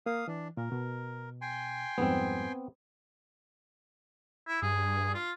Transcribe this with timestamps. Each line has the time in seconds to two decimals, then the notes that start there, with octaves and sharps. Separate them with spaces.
0.06 A#3 F5 D#6
0.28 E3 D4
0.57 A#2 A#4
0.72 B2
1.42 G5 G#5 C6
1.98 F2 G#2 G3 B3 C4
4.47 E4
4.62 G2 G#4
5.14 F4